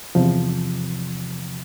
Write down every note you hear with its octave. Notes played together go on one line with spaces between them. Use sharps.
E2 C3 F3